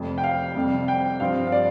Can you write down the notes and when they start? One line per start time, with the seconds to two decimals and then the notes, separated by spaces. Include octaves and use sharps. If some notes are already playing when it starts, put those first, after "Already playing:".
Already playing: F1 F2 C3
0.18 G5
0.24 F5
0.55 F2 C3 G3
0.88 G5
1.20 G2 F3 C4 F5
1.47 F5
1.52 D5